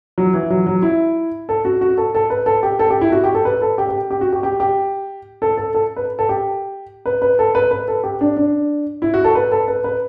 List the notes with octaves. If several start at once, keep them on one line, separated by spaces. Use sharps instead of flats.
F#3
E3
F#3
F#3
E4
A4
F#4
F#4
A4
A4
B4
A4
G4
A4
G4
E4
F#4
G4
A4
B4
A4
G4
G4
G4
F#4
G4
G4
G4
A4
A4
A4
B4
A4
G4
B4
B4
A4
B4
B4
A4
G4
D4
D4
E4
F#4
A4
B4
A4
B4
B4